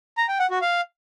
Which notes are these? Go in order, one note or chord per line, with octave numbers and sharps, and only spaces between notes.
A#5
G5
F#5
F#4
F5